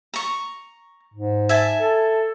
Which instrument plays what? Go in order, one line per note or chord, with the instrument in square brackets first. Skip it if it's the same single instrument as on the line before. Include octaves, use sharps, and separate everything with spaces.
[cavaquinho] A#5 C#6
[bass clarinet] G#2
[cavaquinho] E5 G#5 A5
[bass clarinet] A4